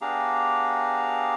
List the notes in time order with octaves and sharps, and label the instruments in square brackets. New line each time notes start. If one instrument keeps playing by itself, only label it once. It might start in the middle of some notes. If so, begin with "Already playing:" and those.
[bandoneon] B3 D4 G4 G#4 F5 A#5